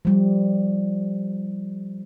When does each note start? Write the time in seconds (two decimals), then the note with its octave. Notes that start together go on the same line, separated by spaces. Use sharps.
0.05 F3 G3